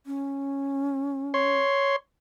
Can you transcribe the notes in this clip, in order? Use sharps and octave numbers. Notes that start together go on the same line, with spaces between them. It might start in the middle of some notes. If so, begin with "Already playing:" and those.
C#4
C#5 C6